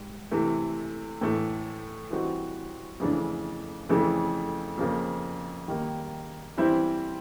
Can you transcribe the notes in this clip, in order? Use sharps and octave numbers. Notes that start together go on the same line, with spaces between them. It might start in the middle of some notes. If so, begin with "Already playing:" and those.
Already playing: G#2 G3
C3 E3 A3
A2 E3 A3
E3 G3 C4 D#4 F#4
F2 C#3 E3 A3 D4
F2 C#3 E3 A3
F2 C#3 F3 A#3
D#3 G3 A#3
E3 G3 C4 E4